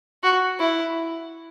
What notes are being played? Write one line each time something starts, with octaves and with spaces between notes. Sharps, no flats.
F#4
E4